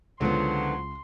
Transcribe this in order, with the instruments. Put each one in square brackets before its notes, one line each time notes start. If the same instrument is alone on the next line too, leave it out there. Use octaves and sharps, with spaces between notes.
[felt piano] C#2 [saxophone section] A2 F3 F#3 [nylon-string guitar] D3 B3 [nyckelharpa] C6